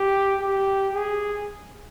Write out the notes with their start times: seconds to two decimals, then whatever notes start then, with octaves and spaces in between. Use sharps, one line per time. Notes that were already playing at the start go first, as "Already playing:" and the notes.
Already playing: G4
0.40 G4
0.93 G#4